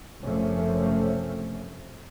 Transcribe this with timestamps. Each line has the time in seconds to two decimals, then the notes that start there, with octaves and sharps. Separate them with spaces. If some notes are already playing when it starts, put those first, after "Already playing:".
0.23 F#1 C3 F3 A3 C4 C#4